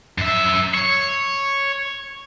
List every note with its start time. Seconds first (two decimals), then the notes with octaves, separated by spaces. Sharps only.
0.18 F#2 E5
0.74 C#5